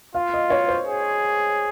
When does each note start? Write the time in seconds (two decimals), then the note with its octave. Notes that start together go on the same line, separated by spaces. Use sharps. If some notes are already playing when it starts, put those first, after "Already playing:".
0.15 F4 F5
0.34 D#5
0.50 C#5
0.68 C5
0.88 G#4